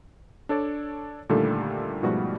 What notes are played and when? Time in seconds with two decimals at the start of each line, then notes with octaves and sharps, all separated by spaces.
0.49 D4 A4 C#5 D5
1.29 A#2 D3 D#3 G3 A3 A4
2.03 G#2 B2 F3 G3 A3 F#4